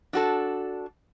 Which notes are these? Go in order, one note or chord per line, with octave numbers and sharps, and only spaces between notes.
D4 F#4 A4